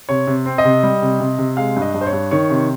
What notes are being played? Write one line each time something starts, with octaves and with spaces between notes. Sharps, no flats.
C3 C#5
C3
C4
D#5
C3
G3
C3
C3
C3
G#3 F5
G2
D#5
G2
C5
C#5
G2
D#3 C#5
C3